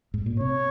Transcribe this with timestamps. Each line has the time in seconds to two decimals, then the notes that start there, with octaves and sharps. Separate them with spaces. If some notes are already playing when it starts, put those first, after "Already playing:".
0.14 G#2
0.26 A#2
0.40 C3 C#5